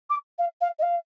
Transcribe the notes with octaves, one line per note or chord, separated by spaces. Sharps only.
D6
F5
F5
D#5
F5